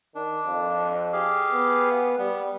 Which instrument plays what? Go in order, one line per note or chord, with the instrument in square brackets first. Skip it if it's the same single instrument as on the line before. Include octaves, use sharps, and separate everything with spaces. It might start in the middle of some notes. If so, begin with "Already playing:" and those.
[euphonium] D#3 [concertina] D4
[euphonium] F2
[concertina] G4 G#4 F5
[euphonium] B3
[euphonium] G3 [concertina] B3